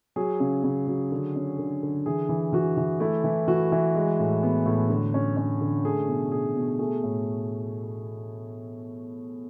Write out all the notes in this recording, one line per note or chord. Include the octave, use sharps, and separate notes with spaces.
F#3 G#4
C#3
C#3
F#3
D3
C#4
D3
D3
E3 G#4
E3
E3 F#4
E3
A3 E4
E3
E3 F#4
E3
G#3
A2
B3
A2
D3
C#4
C#4
D3
A3 G#4
B2
B2 G#4
B2
A3 G#4
A2